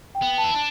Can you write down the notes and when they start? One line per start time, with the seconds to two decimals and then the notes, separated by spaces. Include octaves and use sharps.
0.15 G5
0.22 B3
0.38 A5
0.44 E4
0.54 D4